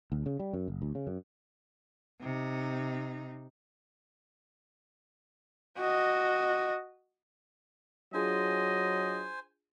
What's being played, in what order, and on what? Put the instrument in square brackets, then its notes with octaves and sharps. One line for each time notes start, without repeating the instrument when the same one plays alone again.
[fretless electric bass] D2
C#3
G3
F#2
F#1
D2
C#3
F#2
[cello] C3 D#4
[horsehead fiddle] F#4 D#5
[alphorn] F#3 [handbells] D4 F4 G#4 [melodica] C5 G#5 [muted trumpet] D#5